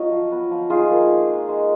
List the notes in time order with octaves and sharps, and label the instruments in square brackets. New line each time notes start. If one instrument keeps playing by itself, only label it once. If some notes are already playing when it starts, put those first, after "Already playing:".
Already playing: [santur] F#3 F4 C#5 D#5
F3
B3
F3
D#4 F4 G#4
A#3
D#4
G#3
G#3